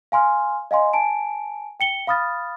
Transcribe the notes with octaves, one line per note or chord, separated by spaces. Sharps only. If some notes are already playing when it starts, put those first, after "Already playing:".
F5 G#5 C6 F6
D#5 F5 G#5 C6
G#5 A5 D7
G5 C#7 G7
F5 B5 D#6 F6 A6